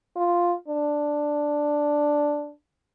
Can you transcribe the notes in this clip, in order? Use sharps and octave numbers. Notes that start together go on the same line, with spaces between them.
F4
D4